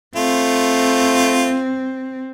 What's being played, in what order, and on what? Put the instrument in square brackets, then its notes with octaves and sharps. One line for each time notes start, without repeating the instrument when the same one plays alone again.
[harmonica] A3 F4 [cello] C4